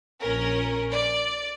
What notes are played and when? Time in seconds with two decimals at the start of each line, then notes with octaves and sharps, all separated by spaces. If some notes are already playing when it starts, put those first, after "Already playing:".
0.20 A#1 C#4 A#4
0.91 D5